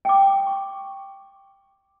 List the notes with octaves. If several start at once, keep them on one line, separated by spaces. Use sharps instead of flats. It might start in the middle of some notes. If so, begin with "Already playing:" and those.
G5 D6
C#6